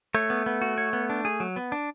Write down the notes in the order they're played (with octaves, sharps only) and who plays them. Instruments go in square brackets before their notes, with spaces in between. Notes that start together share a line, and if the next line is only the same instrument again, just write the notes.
[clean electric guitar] A3 [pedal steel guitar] C#5
[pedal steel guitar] B3
B3
F#4
C#5
B3
D4
G#4
F#3
B3
D4